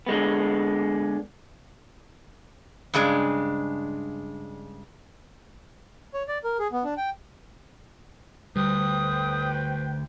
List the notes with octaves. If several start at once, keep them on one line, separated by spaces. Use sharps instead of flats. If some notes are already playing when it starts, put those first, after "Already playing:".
D3 G#3 B3
G2 C#3 G#3 D4
C#5
D5
A#4
G#4
B3
D4
G5
D2 G3 B4 C5 G5 D#6